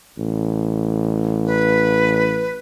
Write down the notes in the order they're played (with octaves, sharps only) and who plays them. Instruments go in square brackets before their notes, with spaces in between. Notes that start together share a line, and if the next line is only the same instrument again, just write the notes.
[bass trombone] A1
[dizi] B4